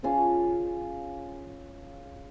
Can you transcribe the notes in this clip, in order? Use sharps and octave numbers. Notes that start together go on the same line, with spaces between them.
C#4 F4 G#4 A5